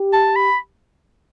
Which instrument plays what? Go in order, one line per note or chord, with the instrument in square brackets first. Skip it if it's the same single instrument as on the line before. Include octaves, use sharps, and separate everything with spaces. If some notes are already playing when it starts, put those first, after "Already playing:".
Already playing: [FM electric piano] G4
[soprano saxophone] A5
B5